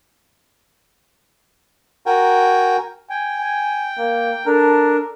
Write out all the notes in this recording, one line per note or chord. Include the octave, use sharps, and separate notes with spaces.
F#4 A#4 G5 G#5
G5 G#5
G#5
A#3
D4 A4 A#4